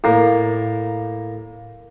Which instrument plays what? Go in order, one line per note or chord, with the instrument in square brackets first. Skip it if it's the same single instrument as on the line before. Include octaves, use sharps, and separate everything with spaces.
[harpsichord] A2 A#3